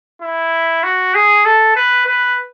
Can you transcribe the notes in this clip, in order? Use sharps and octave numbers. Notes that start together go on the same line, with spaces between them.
E4
F#4
G#4
A4
B4
B4